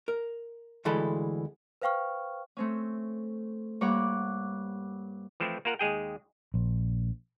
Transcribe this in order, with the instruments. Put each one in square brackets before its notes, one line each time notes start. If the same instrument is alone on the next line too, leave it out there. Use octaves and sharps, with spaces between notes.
[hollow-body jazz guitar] A#4
D2 E3 G#3 A4 B5
[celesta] B4 C5 F5 G5 C#6 F6
[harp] A3 C4 C#4
G2 A#3 C#5 D5 F#5 D6
[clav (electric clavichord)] E3 F3 A3 C4 E4
A#3 F4 A#4 F#5
D#2 G#3 G#4 G5
[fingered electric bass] A#1